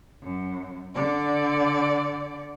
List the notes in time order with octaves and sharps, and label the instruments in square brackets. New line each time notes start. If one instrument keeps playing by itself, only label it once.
[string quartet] F#2
D3 D5